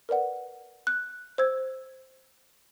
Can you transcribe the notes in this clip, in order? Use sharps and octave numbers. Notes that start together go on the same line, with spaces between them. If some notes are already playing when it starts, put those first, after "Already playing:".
A#4 B4 D5 F#5
F#6
C5 E6 G#6